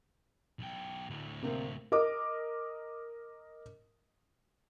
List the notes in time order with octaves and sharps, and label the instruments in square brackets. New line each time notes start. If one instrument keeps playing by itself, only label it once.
[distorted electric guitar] B1 G5
D2 A2
[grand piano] C3 A#3 C4
[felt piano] A#4 D#5 D6